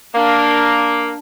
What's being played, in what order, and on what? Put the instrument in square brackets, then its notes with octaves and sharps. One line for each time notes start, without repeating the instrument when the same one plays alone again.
[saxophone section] A#3 [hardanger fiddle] D4